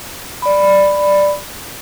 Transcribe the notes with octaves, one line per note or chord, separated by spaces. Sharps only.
D5 B5